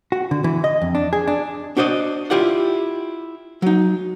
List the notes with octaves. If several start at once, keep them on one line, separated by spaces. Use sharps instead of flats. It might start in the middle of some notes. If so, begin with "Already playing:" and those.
F#4
D3
E3
D#5
F2
D4
G#4
D4
D4 F#4 C5 D5 D#5
E4 F4 G4 D5 F#5
F#3 D#4